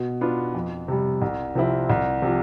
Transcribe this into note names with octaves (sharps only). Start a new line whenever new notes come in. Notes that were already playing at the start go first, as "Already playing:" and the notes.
Already playing: B2
B3 D4 F4
F2
C3 G3
C2
C3 F3 C4 E4
C2
C3 F3